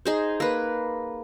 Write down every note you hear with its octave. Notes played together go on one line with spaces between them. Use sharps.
D#4 G#4 C5
A#3 B4